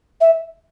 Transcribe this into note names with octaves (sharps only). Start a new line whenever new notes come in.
E5